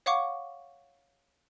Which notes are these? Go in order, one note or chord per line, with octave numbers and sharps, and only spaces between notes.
C#5 F5 F#5 C#6 D6